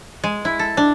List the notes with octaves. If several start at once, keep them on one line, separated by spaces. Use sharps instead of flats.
G#3
E4
A4
D4